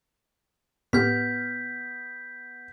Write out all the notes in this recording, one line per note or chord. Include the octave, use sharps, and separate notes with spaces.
A2 B3 G4 F6 G6 B6